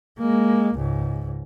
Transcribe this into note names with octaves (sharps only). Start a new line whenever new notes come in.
G#3 A#3
C#2 G#2